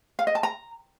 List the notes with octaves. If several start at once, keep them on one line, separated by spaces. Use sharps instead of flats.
F5
D#5
A5
A#5